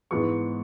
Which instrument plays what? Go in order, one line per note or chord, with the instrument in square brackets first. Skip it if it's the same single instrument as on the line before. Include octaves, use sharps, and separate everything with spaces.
[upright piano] G#2 E3 G#3 B3 C#6